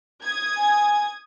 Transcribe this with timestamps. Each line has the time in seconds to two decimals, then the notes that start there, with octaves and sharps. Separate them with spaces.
0.24 D#6 G#6
0.57 G#5